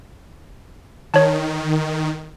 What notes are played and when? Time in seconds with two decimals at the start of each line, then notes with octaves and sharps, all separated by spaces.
1.14 D#3 C#5 A5